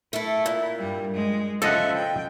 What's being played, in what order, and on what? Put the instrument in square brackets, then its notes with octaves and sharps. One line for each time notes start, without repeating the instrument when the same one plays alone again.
[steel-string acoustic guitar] A3 A4 [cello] E4
[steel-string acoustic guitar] A#2
[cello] G2 G3
G#3
[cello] C#3 E5 [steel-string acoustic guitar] F3 G#3 [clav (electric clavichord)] A4 D#5 F#5
[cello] G5